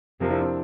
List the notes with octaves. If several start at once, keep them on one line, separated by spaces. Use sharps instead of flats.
F2 C3 F3 A#3
D4 E4
C4 D4